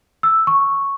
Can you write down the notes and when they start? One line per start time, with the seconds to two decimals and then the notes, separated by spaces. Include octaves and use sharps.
0.23 E6
0.47 C#6